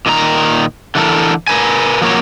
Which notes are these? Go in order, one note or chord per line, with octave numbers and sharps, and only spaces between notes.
A#2 D#3 D#4 A#5
D3 E3 A4 A#4
A#4 B4 G#5
F3 F#3 A#3 A#4 C#5